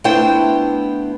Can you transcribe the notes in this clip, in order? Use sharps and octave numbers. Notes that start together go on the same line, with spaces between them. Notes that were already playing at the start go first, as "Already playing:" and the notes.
A3 B3 D4 E4 C5 G5